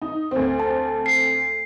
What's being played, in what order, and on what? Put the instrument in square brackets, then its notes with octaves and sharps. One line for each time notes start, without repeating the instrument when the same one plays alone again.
[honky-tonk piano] D#4
D2 C4
[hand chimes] A5
C7